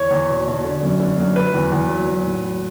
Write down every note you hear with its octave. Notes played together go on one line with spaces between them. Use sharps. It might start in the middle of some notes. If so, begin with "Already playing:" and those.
Already playing: E2 C#5
E2
B2
B2
D3
F#2
D3
F#2
F#3 B4
E2
E2
F#3
F#3
A2
F#3